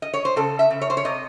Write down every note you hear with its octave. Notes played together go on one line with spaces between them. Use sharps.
D#5
C#5
C5
C#3 A4
E5
C#3
C#5
C5
C#5
C3 D#5